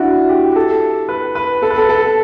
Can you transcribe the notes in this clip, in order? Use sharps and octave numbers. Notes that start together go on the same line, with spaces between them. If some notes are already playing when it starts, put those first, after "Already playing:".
Already playing: D4 E4 F#4
G4
A4
B4
B4
A4
B4
A4
A4